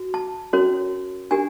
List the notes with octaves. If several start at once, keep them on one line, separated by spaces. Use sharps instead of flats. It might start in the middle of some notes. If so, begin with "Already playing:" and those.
Already playing: F#4
A5
C#4 F#4 A#4 C#5
D4 G4 A#4 G#5